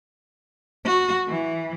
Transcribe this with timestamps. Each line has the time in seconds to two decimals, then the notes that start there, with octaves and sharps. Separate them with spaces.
0.85 F#4
1.29 E3